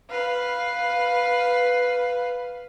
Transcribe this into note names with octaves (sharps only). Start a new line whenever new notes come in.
B4 F5